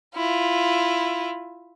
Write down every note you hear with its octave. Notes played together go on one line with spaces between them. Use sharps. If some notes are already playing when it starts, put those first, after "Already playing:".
E4 F4